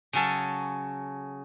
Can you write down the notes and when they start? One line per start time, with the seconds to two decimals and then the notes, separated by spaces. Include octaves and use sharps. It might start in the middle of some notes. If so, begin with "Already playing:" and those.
0.13 C#3 F#3 C#4 A4